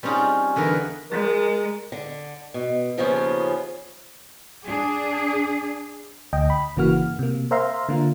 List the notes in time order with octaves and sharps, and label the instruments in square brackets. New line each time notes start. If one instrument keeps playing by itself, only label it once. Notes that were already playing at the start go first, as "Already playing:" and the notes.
[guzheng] G3 C4 C#4 D#4 F4 G#4
E2 D3 D#4 A#4 B4 G#5
[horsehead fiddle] G#3 [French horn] A#4
[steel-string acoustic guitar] D3
B2
D#2 C#3 F3 B3 C#4 C5
[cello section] D4 G#4
[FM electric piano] D2 D#5 G5
B5
G1 C#3 E3 A#3 F#4 F6
C3 A#3
A#4 C5 E5 F5 A#5 C6
D3 A#3 D4 F4